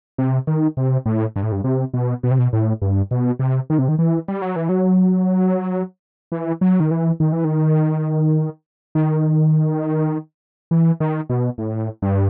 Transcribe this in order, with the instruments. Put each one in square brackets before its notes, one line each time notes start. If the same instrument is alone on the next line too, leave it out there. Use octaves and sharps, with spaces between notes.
[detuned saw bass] C3
D#3
C3
A2
G2
A2
G2
C3
B2
B2
C3
B2
A2
G2
B2
C3
D#3
C3
D#3
E3
G3
F#3
E3
F#3
E3
F#3
D#3
E3
D#3
E3
D#3
D#3
E3
D#3
B2
A2
G2